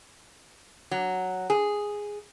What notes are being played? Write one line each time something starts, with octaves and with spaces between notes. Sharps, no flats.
F#3
G#4